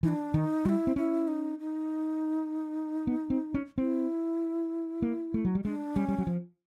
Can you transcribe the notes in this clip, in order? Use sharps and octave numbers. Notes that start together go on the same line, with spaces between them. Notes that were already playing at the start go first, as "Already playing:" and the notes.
E3 D#4
D4
D#3 D#4
G3 E4 F#4
C4
C#4 E4
D#4
D#4
B3
C4
C#4
C4 E4
A#3
A3
F#3
G3
G#3 D4
G3 C#4
G3
F#3
F3